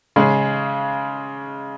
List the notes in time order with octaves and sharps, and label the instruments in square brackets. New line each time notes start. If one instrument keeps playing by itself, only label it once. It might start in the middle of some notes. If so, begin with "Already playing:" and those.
[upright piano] C#3 G#3 C#4 G#4